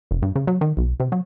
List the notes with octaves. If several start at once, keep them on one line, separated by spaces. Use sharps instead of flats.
F1
G2
C#3
F#3
D#3
B1
C3
F#3